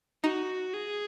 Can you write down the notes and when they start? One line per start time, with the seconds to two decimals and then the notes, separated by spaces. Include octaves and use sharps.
0.24 D#4 F#4
0.73 G#4